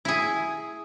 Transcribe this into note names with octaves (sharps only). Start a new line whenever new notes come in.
E4 G#4